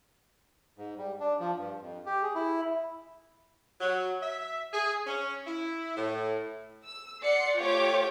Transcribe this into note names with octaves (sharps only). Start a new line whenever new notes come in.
G#2
G3
D4
F3
G2
F2
G4
G#4
E4
F#3
E5
G#4
C#4
E4
A2
E6
D5 F#5 C6 C7 C#7
A3 F4 G4 C#5 G5 D6